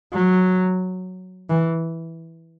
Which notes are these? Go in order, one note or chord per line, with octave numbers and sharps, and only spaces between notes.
F#3
E3